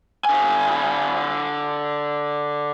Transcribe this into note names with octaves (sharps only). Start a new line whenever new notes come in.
D3 G#5